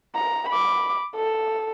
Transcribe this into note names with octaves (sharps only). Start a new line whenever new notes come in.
A#5
B5 D6
A4